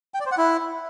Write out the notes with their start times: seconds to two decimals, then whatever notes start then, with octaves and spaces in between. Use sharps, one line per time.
0.14 G5
0.20 D5
0.26 C5
0.32 F#5
0.37 E4